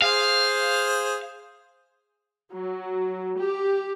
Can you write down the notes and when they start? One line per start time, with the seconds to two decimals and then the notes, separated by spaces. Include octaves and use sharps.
0.02 G#4 C5 F5
2.52 F#3
3.37 G4